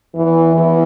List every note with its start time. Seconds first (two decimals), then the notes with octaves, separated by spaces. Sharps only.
0.15 E2 E3
0.54 E2 E3